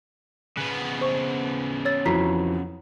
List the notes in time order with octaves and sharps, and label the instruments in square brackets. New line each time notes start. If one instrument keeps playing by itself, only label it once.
[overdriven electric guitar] C#3 B3 [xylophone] F#6
[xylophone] C5 C#6
C#5 E6 A6
[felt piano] F2 E3 F#3 [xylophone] A#5 B6 C7